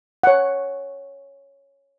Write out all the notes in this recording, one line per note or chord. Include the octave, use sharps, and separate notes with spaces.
C#5 F#5